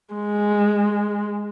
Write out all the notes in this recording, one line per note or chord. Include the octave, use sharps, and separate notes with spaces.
G#3